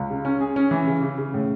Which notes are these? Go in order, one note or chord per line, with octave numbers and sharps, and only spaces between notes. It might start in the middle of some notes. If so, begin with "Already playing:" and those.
Already playing: C#2
C#3
C#4
G#4
C#4
E3
C#3
C#3
C#3
A2